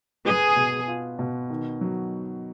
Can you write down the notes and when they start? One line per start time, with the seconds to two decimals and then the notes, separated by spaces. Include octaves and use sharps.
0.25 G#4 B4
0.56 B2
0.88 F4
1.19 B2
1.50 D#3
1.81 F#3